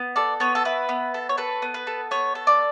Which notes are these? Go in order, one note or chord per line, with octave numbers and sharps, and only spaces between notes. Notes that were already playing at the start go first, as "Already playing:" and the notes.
Already playing: B3
A4 D5
B3 C#5
A4
E4 B4
B3
A4
C#5
A4 B4
B3
B4
A4
B3 C#5
A4
D5